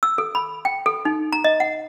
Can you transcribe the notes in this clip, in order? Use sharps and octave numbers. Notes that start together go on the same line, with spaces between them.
E6
A4
B5
G5
A4
D#4
A#5
D#5
F#5